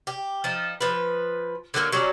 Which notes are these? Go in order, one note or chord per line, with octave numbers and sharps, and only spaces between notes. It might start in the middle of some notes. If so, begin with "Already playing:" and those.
G4
F3 D#4
F3 B4
D3 F#3 G#3 A#3
F#3 G3 C#4 D5